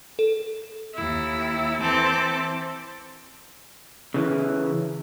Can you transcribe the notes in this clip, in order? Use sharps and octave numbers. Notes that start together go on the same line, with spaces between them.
A4
D#2 E4
E3 C4 A4 D6
C#3 E3